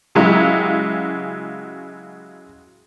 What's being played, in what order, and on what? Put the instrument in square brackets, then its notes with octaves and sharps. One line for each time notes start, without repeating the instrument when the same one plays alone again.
[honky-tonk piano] C#3 F#3 G#3 E4 G4